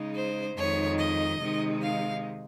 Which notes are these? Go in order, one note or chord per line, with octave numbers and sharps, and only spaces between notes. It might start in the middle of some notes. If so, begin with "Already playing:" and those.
Already playing: C#3 G#3 D#4
C5
F2 D#3 G#3 D#4 C#5
D#5
C3 D#3 G#3 D#4
F5